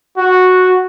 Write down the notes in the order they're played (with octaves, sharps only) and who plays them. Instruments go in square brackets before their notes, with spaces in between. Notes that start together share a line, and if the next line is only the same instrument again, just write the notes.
[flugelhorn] F#4